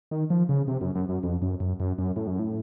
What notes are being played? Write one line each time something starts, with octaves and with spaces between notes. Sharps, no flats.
D#3
F3
C#3
C3
F#2
F#2
F#2
F2
F#2
F#2
F#2
F#2
A2
F#2
A2